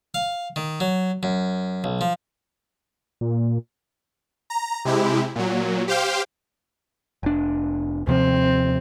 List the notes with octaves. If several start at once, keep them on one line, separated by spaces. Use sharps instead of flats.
F5
D#3
F#3
F#2
B1
F3
A#2
A#5
C3 G#3 E4 G4
A#2 F#3
G4 C5 F5 G5
F1 D4
D#2 C3 F3 C4